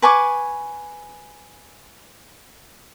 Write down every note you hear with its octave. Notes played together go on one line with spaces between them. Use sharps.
B4 G#5 C#6 D6